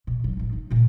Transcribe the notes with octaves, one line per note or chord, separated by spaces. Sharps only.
B2
A1 F#3
A2 F#3
D#4
A#2 C#3